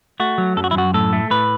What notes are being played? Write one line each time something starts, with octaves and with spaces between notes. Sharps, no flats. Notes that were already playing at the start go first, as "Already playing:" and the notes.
A3 F#4
F#3
F#2 A4
F#4
E4
F#2 F#4
A2 A4
A3
A2 B4